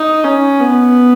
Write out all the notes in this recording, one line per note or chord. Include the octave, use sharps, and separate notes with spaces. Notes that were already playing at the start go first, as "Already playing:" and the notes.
Already playing: D#4
C#4
B3